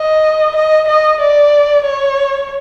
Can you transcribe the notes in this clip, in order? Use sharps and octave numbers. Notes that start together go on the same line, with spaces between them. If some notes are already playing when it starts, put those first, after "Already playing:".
Already playing: D#5
D#5
D#5
D5
C#5